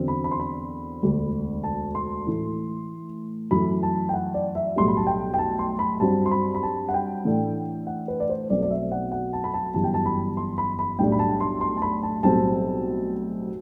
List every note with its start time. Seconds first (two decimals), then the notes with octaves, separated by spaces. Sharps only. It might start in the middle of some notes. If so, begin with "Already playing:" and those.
Already playing: E2 D3 F#3 C4
0.08 B5
0.24 B5
0.31 C6
0.40 B5
1.02 E1 D2 D3
1.64 A5
1.95 C6
2.27 A2 E3 A3 E4
3.51 F#2 E3 A3 B5
3.83 A5
4.09 G5
4.14 F#5
4.34 D5
4.55 E5
4.76 B1 A2 G3 C6
4.88 B5
4.97 A5
5.07 G5
5.34 G5
5.39 A5
5.59 C6
5.79 B5
6.00 G2 F#3 C4 A5
6.26 C6
6.31 B5
6.55 B5
6.63 A5
6.89 F#5
6.94 G5
7.25 A2 E3 A3 D4
7.87 F#5
8.08 B4
8.20 D5
8.29 C5
8.50 B1 B2 A3 C4 D5
8.62 D5
8.70 E5
8.92 F#5
9.12 F#5
9.33 A5
9.44 B5
9.54 A5
9.74 G1 F#2 E3 G3 A5
9.84 G5
9.94 A5
10.06 B5
10.37 C6
10.58 B5
10.79 B5
10.99 B1 A2 G3 D4 G5
11.12 B5
11.19 A5
11.40 C6
11.61 C6
11.77 A5
11.82 B5
12.03 A5
12.23 B1 A2 G3 C4 A5